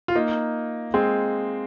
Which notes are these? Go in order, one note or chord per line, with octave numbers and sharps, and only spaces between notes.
F4
A#3 D#4
G#3 C4